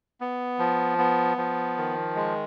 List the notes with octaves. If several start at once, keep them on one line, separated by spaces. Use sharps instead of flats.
B3
F3
B3
F3
D#3
G#3